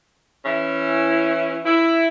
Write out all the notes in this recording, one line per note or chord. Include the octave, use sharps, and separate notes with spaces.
E3 C#4 E4
E4